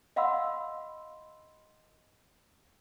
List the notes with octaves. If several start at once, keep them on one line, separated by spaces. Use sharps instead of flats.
D#5 F5 F#5 B5 C6 E6